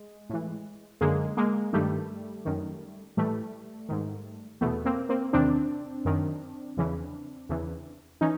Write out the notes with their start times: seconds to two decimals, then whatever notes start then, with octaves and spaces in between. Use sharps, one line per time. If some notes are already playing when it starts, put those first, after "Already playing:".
Already playing: G#3
0.29 A2 E3
1.01 F#2 D3 G#3 A#3
1.37 G#3 A#3
1.73 G2 D#3 G3 A3
2.45 F#2 D#3
3.17 A2 E3 G3 A3
3.89 G#2 D#3
4.61 E2 B2 A3 B3
4.85 A#3 C4
5.09 A#3 C4
5.33 E2 C3 D#3 C4 D4
6.05 F#2 D#3
6.77 E2 C#3 E3
7.49 E2 C#3 E3
8.21 E3 C#4 D#4